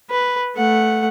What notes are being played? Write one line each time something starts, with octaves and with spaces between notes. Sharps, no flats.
B4
A3 F#5